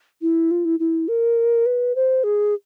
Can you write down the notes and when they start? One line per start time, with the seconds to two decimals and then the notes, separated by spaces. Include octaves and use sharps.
0.22 E4
0.51 F4
0.65 E4
0.80 E4
1.08 A#4
1.66 B4
1.95 C5
2.24 G#4